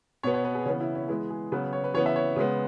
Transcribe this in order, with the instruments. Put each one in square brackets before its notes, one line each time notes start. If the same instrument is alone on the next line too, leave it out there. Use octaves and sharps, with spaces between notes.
[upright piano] B2 B3 C#5
C#5
B4
G#4
C#3 E3 B3 C#4
E4
C#4
E3 G#3 B3 E4
G#4
C#3 F#3 B3 B4
C#5
B4
C#3 E3 B3 C#5
E5
C#5
C#3 G#3 B3